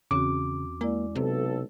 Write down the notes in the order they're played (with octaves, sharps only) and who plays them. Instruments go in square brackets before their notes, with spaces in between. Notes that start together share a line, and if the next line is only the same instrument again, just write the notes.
[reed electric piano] E2 D6 [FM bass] C#3 [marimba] C4 C#4 F#4
[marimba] G#3 E4 D5 [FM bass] A#3
[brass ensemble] B1 A4 [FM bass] C3